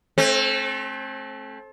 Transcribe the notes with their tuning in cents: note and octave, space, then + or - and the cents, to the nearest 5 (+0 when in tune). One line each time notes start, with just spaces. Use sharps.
A3 -25 C4 +35